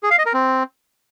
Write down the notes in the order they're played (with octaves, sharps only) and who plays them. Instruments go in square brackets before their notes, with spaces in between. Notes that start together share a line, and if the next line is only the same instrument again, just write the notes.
[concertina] G#4
F5
D#5
A#4
C4